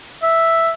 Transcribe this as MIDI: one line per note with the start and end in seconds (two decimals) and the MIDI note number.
0.23 0.71 76